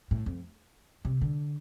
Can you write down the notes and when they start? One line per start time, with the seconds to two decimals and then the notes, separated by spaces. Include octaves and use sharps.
0.11 A2
0.26 F2
1.05 C3
1.21 D3